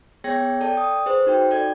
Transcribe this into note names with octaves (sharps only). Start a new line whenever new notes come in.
B3 G#4 C#5 G5 G#6 A#6
A4 D5 G5 A5
D#6
G#4 B4 C5
D#4 F#4 G5
A4 D5 G#6